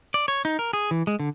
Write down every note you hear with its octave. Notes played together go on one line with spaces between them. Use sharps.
D5
C#5
D#4
A#4
G#4
E3
G#3
D3